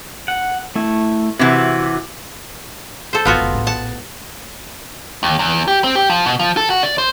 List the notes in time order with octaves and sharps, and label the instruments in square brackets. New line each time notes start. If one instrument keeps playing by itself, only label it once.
[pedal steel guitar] F#5
A3 E4
[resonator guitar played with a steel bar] C3 E3 [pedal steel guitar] F#4
[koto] A4 C5
[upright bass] G#1 F#2 [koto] B3 F4 F#4
[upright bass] F1
A#1 A2
[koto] F#5 A5
[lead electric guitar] D#2
E2
G4
C4
G4
F3
B2
F3
A4
F#4
D5
C5